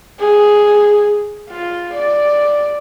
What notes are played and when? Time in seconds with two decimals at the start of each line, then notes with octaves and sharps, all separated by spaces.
0.20 G#4
1.50 F4
1.94 D5